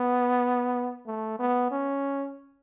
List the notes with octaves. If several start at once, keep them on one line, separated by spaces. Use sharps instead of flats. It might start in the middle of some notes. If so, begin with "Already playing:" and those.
Already playing: B3
A3
B3
C#4